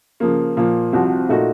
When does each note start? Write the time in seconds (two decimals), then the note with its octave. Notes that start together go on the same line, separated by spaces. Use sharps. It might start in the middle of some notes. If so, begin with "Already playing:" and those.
0.20 C#3 F3 A#3
0.56 A#2 F3 A#3
0.93 C2 C3 F3 C4 F#4
1.29 A#2 A3 D#4 F#4 A4